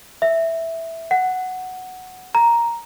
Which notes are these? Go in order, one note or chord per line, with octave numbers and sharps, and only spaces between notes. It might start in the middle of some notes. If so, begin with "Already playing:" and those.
E5
F#5
A#5